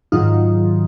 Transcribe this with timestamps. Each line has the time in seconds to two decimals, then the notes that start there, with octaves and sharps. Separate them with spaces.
0.12 G#2 D#3 F#3 D#4 F4